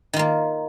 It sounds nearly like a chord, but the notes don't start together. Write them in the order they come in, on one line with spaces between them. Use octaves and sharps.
D#3 F4 A#3